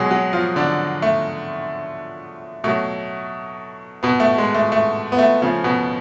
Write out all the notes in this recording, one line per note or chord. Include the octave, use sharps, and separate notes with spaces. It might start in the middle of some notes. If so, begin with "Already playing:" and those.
Already playing: B2 F#3 G#3 G#4
F#3 F#4
F3 F4
D3 D4
A3
B2 F#3 A3
B2 B3
A3
G#3
A3
A3
B3
A3
C#3 F3 A3
B2 B3